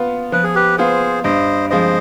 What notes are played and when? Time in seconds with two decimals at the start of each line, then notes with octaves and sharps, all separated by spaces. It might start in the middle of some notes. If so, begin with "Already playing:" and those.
Already playing: B3 F4
0.32 F3 B4
0.43 G#4
0.55 G4 B4
0.78 B3 F4 G#4 C5
1.24 G2 C5 D#5
1.70 F3 G#3 C4 C5 D#5